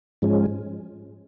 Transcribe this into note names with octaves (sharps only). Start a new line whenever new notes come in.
G#2 F3 G#3 C#4